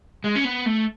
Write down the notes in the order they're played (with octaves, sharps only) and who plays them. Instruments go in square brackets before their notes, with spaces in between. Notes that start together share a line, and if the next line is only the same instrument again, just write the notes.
[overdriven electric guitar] G#3
C#4
B3
A3